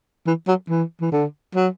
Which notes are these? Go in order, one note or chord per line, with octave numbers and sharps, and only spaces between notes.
E3
F#3
E3
E3
D3
F#3